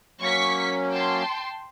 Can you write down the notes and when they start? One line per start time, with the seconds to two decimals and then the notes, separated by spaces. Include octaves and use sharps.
0.21 F#3 A#3 C#4 C#6 B6
0.91 G5 A5 C6